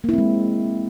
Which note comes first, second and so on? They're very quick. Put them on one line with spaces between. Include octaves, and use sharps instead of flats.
A#3 E4 C4 G#3